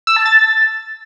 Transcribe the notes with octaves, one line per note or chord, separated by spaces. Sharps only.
E6
A5
A6